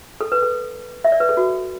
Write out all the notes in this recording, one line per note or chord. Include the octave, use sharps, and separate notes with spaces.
A4
B4
A4
E5
D5
B4
A4
F#4